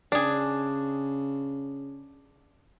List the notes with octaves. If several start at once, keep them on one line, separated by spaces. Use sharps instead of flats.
C#3 D4 G#4